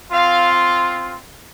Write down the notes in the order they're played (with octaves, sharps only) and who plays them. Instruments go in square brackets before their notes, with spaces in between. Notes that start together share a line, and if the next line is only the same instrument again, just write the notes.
[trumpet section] C4 F4 F5